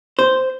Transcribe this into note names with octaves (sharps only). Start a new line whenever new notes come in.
C5